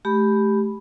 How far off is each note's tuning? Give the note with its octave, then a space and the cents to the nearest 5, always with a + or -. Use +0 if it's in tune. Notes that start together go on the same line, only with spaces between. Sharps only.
A3 -35 G4 +0 B5 +0